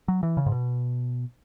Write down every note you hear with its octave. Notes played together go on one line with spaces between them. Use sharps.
F#3
E3
C#3
G#2
B2